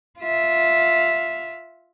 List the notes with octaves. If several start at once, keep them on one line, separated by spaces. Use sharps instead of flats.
F4 E5